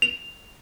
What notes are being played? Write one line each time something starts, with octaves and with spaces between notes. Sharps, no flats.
F7